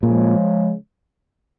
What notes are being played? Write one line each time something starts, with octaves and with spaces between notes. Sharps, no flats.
A#2 C#3 F3 G#3